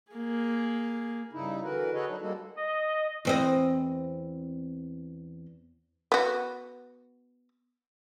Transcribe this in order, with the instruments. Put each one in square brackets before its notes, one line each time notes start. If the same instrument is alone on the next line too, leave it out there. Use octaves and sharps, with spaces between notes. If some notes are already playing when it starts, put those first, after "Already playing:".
[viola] A#3 G#4
[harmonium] G2 C#3 D#4 E4
D3 E3 F#4 A#4 B4
F#4 G#4 A4 B4 C#5 D#5
F#3 D4 D#4
G3 G#3 A#3 F#4 A4
[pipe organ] D#5
[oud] E2 C4 D#5
[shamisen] B3 F#4